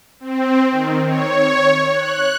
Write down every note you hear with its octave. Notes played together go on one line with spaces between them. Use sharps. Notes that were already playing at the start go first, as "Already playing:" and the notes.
C4
D#3
C#5
F#6